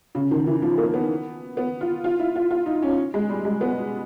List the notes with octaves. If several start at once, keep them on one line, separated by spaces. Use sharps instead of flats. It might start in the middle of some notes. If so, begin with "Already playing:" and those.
C#3
D#3
E3
F3
A#3
B3
B3
F4
F4
E4
F4
F4
D#4
C#4
G#3
G3
G#3
B3